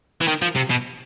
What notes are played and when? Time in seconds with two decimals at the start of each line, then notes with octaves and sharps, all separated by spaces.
0.21 E3
0.28 D#3
0.42 F3
0.56 C3
0.70 B2